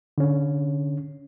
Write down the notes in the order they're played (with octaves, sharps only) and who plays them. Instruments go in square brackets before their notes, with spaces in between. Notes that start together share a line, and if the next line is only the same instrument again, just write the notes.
[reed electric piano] D3 C#4